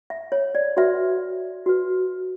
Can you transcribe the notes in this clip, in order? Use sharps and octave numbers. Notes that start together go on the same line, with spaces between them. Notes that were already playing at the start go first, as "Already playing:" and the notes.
E5
C#5
D5
F#4 B4 E5
F#4 B4